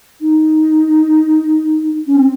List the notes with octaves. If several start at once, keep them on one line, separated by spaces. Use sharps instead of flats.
D#4
C#4
C4